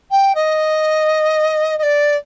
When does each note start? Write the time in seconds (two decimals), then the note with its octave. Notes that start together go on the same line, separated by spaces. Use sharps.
0.11 G5
0.35 D#5
1.78 D#5
1.82 D5